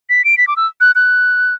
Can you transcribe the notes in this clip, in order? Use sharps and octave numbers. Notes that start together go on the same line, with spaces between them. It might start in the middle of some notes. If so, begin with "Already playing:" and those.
B6
D7
B6
D6
E6
F#6
F#6